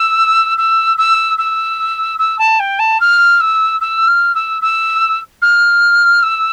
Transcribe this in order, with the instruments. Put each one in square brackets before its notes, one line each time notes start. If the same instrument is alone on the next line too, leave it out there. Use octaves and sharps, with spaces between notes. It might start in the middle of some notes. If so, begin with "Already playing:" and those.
Already playing: [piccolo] E6
E6
E6
E6
E6
A5
G5
A5
F6
E6
E6
F6
E6
E6
F6
E6